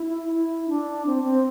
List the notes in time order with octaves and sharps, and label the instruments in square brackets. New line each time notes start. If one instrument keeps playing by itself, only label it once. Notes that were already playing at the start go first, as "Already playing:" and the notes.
Already playing: [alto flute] E4
E4
D4
C4
C4